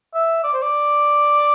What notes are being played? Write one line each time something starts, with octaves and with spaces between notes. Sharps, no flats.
E5
D5
C5
D5